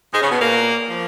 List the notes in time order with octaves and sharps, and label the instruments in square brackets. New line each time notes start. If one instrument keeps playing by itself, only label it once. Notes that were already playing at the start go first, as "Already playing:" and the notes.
[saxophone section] G#2 G#3
C#3 C#4
B2 B3
A#2 A#3
F3